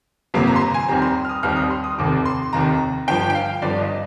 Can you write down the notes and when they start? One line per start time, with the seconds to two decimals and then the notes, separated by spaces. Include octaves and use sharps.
0.34 G1 F2 C3 F3 A#3
0.47 A#5
0.56 C6
0.61 A#5
0.74 G#5
0.88 D#2 D#3 G3 C4 A#5
1.02 C6
1.25 F6
1.29 D#6
1.43 D#2 D#3 G3 C4 F6
1.56 D#6
1.70 C6
1.84 D#6
1.98 F1 D#2 D#3 D6
2.25 C6
2.53 F1 D#2 D#3 A#5
3.08 G1 G2 F3 G5
3.30 G5
3.35 F5
3.62 G1 G2 F3 D5
3.81 D#5